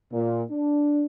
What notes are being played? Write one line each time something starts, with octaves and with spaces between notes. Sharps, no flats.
A#2
D4